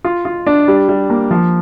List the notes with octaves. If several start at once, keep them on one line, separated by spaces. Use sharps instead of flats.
F4
F4
D4
G3
G3
A#3
F3